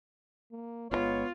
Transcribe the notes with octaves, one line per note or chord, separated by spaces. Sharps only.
A#3
G1 C3 G#3 B3 F4 C#5